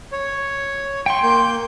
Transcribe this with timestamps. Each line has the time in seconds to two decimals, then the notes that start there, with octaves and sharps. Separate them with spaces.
0.12 C#5
1.06 G5 C6 C#6
1.23 A#3 G6